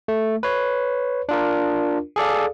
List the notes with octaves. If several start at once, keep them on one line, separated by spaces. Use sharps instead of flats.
A3
B4 C#5
D4 F4 A#4
G#4 A4 D5 F5